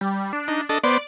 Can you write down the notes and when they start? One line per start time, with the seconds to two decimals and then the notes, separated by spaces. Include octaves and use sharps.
0.01 G3
0.33 D4
0.48 D#4
0.69 D4 A4 D#5
0.84 B3 C5 D5 D6